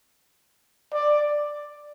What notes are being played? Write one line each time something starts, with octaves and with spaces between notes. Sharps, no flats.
D5